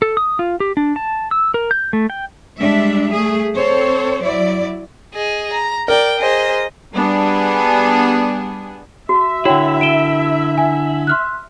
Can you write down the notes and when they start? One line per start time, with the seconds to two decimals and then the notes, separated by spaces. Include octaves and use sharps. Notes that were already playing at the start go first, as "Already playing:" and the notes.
0.02 A4
0.17 D#6
0.39 F4
0.60 G4
0.77 D4
0.96 A5
1.31 E6
1.54 A#4
1.71 G6
1.93 A3
2.10 G5
2.59 G3 G#3 D4 E5
3.11 A3 G#4
3.55 C4 A4 C5 C#5
4.22 F#3 E4 D5
5.14 G#4 D#5
5.53 A#5
5.88 A#4 D5 G5
6.19 G#4 C5 D#5
6.94 G3 B3 D4 G#4
9.09 F#4 E5
9.45 D3 E4 F#4 C#5 F#5 G5
9.81 D7 E7 G7
10.58 G#5
11.07 C6 F6 F#6